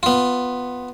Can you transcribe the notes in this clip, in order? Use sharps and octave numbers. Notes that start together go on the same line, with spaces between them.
B3 F4